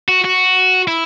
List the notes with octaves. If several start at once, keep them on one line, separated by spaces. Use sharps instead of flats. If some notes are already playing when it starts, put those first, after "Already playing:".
F#4
F#4
E4